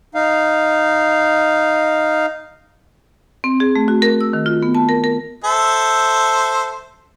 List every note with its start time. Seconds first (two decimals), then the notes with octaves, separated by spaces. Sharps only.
0.15 D#4 F5
3.44 C4
3.60 G#4
3.76 A3
3.88 F#4
4.02 A#4
4.21 E6
4.33 D#3
4.46 F4
4.63 B3
4.75 A5
4.89 A#4
5.04 A#4
5.45 A4 C5 E5